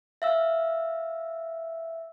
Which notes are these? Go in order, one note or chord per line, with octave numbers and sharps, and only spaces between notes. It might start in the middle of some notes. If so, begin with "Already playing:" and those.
E5 F5 E6